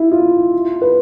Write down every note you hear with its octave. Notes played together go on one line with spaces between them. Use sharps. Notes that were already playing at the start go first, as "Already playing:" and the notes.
Already playing: E4
F4
B4